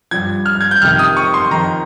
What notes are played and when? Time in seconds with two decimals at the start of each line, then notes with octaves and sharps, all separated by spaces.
0.11 G2 F3 G#6
0.46 F6
0.61 G#6
0.71 G6
0.81 F2 C3 D#3 F6
0.99 D#6
1.17 C#6
1.34 C6
1.51 F2 D#3 A#5